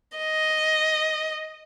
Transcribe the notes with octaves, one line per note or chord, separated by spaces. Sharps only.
D#5